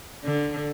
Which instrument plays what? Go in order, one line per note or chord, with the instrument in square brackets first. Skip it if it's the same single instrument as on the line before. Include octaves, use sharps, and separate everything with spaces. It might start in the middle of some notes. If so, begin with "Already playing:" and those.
[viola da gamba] D3